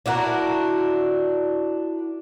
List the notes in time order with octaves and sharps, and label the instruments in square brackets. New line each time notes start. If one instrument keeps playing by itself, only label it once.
[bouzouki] D4 E4 F#4 A#4